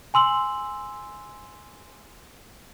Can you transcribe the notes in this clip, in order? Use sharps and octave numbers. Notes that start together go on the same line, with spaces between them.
G#5 C6 E6 F#7